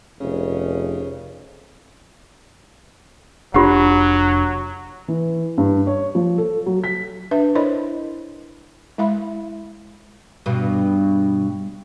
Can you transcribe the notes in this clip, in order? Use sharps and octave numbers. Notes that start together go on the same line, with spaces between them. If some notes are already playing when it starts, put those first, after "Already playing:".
F1 C#3
F1 F#3 D4 F4 G4 F#5
E3
G2
C#5
F3
A4
F#3
B6
D4 B4 E5
E4 A#4 C5 C#5 D#5 B5
G#3 E4 E5 F5 B5
G2 B2